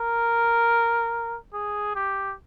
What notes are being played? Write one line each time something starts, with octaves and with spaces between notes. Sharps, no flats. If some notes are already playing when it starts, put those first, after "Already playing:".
Already playing: A#4
G#4
G4